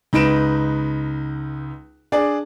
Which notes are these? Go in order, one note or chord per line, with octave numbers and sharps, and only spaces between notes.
C#2 D#4 B4 D7 E7
D4 G#4 D5